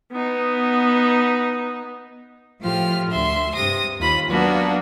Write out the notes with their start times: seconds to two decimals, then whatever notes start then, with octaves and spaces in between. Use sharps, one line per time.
0.12 B3 D#4
2.61 A2 F3 F4 G4 F6
3.11 D2 E5 C6
3.55 G2 C3 D#6 A#6
4.00 D#2 F4 B5
4.30 F#3 A#3 B3 D4 F#4